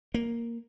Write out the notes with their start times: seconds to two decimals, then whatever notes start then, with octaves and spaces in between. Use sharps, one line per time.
0.14 A#3